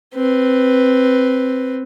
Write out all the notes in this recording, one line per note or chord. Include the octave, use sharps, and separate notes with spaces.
C4 B4